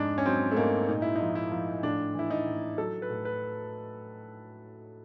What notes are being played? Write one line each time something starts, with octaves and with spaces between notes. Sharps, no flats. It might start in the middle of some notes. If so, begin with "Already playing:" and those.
Already playing: F2 G#2 D4
C#4
F#3 C4
A3
G#2 A#3
A#2 D#4
E4
D#4
F3
E4
F3
A2 D4
E3 E4
D#4
A2
F#3 A4
B4
A2
B4